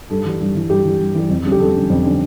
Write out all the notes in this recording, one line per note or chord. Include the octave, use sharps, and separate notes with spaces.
G2 A4
E3 G3
G2
E3 G3
G2 G4
E3 G3
G2
E3 G3
F2
D3 G3 C#4
G4
F2 A4
D3 G3 C#4
F2
D3 G3 C#4